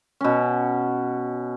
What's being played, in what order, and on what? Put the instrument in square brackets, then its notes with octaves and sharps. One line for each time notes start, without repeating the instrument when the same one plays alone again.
[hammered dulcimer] B2 C#4